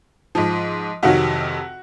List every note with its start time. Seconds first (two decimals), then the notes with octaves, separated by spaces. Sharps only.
0.35 G#2 F3
1.03 F2 C3 D#3 F#3 F#4